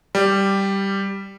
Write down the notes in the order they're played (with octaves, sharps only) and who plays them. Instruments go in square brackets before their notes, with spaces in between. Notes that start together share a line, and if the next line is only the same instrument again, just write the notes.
[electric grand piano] G3